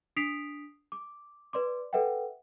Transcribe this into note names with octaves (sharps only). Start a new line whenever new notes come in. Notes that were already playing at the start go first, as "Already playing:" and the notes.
D4 D#6 B6 C7 D7 F7
D6
B4 D5 C6 D6
A4 B4 E5 F#5 G5